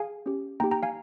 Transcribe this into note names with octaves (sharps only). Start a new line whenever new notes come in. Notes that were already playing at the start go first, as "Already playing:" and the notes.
Already playing: G#4 F5 G#5
C#4 G4
A#3 D#4 G4 G5 A#5
G5 A#5
F5 G#5